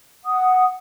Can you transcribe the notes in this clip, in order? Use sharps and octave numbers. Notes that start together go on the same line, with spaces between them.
F#5 D#6